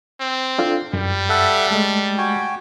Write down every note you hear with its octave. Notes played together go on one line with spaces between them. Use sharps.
C4
D4 F4 A4
F#2 G3
A4 E5 F#5
G#3 A3 D#5 A5
F#4 G5 G#5